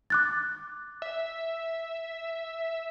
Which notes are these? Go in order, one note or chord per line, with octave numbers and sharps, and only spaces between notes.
D6 F#6 A6
E5